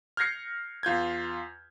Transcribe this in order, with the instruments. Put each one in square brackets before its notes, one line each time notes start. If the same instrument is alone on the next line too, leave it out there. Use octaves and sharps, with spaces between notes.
[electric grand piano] F6 G6 G#6 A#6 C7 C#7
E2 F4 G6 G#6